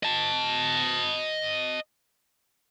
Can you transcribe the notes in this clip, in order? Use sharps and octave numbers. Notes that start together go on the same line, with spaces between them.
D#5 A5